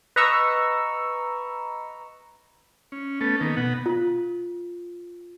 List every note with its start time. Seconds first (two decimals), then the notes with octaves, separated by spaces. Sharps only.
0.16 B4 D#5 A#5 C#6 E6
2.92 C#4
3.21 A3 B3 C#4 A4
3.40 D#3 A#3 B3
3.57 B2 B3 F#5
3.86 F4